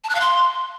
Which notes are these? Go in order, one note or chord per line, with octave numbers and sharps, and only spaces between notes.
A5
F#6
F5
C6